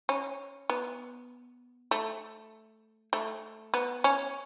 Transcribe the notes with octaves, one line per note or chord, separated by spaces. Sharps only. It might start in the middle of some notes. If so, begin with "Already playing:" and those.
C#4
B3
A3
A3
B3
C#4